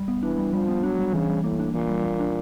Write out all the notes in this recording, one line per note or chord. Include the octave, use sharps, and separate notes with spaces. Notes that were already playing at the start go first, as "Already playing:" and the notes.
Already playing: G3
B3
E3 D4
G3
F3 G3
B3
F#3 D4
G3
C#3 E3
G3
A2 A#3
D4
A#2 E3
G3
A#3
D4